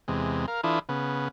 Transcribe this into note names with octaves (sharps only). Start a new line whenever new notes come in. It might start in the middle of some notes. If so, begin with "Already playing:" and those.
E2 C3 G#3
A#4 F5
E3 D4 E4 F4 A4 D#6
C#3 B3